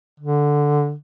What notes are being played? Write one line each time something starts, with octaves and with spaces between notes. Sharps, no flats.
D3